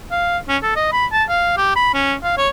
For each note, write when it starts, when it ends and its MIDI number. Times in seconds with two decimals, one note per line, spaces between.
0.11 0.38 77
0.48 0.57 61
0.63 0.76 69
0.76 0.91 75
0.93 1.06 83
1.12 1.24 81
1.29 1.54 77
1.57 1.76 67
1.76 1.93 83
1.94 2.15 61
2.23 2.33 77
2.38 2.49 73